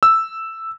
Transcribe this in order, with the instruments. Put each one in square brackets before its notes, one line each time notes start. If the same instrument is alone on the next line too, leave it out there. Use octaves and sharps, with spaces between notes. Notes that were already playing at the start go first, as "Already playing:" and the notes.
[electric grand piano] E6